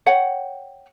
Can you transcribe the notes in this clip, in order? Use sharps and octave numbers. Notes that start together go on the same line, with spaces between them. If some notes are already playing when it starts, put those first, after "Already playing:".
C#5 F#5 G5